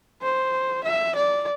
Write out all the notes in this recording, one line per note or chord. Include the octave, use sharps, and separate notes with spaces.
C5
E5
D5